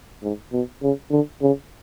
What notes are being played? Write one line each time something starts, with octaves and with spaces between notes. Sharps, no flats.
G#2
B2
C#3
D3
C#3